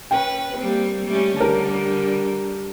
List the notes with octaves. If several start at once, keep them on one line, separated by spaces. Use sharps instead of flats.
C#4 B4 G5
G3 A#3 C4
G3 A3 C#4
D3 G3 A#4 A5